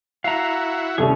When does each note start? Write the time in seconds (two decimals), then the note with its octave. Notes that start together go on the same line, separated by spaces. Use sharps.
0.24 E4 F#4 F5 A#5
0.98 D#2 C3 G3 A#3 C#4 E4 G#4 A4